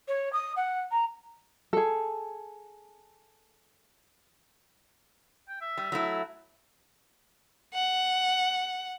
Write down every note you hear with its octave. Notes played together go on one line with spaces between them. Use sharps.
C#5
D#6
F#5
A#5
G#4 A4
G5
E5
G3
F#3 A3 E4
F#5